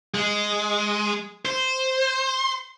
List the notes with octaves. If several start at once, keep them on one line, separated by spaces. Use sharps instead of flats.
G#3
C5